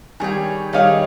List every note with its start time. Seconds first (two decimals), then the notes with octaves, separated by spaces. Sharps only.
0.20 D#3 G3 G#4 C#5 G5
0.73 D#3 G3 D#4 G#4 C#5 F5